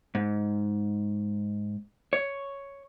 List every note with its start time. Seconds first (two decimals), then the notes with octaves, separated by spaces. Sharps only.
0.15 G#2
2.13 C#5